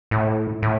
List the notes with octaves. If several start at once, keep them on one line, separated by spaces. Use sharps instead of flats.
A2
A2